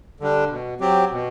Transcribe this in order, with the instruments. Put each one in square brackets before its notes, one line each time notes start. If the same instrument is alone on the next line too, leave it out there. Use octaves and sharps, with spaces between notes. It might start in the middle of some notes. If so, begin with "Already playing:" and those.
[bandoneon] D3 G3 D4
B2
F#3 C4 G4
B2